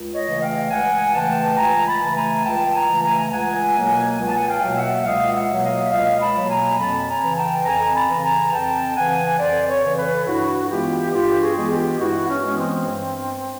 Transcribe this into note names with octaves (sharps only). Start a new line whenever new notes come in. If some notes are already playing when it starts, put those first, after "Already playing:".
Already playing: C#2
C#5 D#5
C#3 E3 A3
F5 G5
C#2 F#5 G#5
C#3 E3 A3 G5 A5
C#2 G#5 A#5
A5 B5
C#3 E3 A3 B5
G#5 A#5
C#2 G5 A5
G#5 A#5
C#3 E3 A3
G#5 A#5
C#2 F#5 G#5
B2 F#3 A#3
C#2 G#5
A5
F#5 G#5
F5 G5
B2 F#3 A#3
G5
E5 F#5
C#2 D#5 F5
E5 F#5
B2 F#3 A#3
D#5 F5
E5
C#2 D#5 F5
A5 B5
B2 F#3 A#3
G#5 A#5
F2 A5 B5
G#5 A#5
C#3 E3
G5 A5
F2 G#5 A#5
A5 B5
C#3 E3 A5
G#5 A#5
F2 G5 A5
C#3 E3 F#5 G#5
F2 C5 D5
B4 C#5
C#3 E3
A4 B4
G2 E4 F#4
E3 G#3 B3 F4 G4
G2 F4 G4
F#4 G#4
E3 G#3 B3
F4 G4
G2 E4 F#4
C#4
E3 G#3 B3
C4
G2